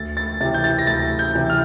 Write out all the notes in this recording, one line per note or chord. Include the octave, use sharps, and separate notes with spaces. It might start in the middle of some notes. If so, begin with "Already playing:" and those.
Already playing: D2 A6
A6
C3 E3 A6
G6
A6
A#6
D2 A6
G6
C3 E3
F6